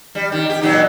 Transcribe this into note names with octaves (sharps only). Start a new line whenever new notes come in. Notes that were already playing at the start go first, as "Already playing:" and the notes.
G3
D#3
G4
A#2 F#3 D#4